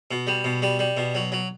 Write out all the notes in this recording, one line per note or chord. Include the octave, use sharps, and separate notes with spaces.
B2
G3
B2
G3
G3
B2
F#3
F#3